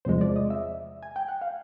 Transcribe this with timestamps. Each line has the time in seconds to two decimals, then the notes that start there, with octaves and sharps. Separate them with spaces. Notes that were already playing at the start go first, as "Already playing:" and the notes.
0.05 E2 C3 F3 G#3 C5
0.21 D5
0.36 D#5
0.50 E5
1.03 G#5
1.16 G5
1.28 F#5
1.42 F5